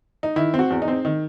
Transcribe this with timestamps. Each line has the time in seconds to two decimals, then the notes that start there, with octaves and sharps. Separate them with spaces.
0.23 D#4
0.36 D#3 E4
0.54 C4
0.59 F#4
0.70 E2
0.82 D#4
0.88 C4
1.05 D#3